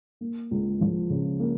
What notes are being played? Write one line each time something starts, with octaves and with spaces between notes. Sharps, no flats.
A#3
C#2
F3
C#3
A#3